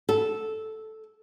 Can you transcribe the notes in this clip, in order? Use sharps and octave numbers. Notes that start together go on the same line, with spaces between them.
A4